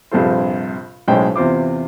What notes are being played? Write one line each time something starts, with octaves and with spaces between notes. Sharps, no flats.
A#1 G2 C3 F4 A4 C5
B1 A2 G#3 C#4 C5 G5
E2 C3 F4 C5 D6